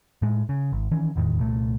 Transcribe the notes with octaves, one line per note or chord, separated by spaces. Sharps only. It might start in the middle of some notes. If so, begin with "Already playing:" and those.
A2 G#3
C#3
G#1
D#3 E3 C#4
F1 E2 A2 D#3
C2 A#2 A3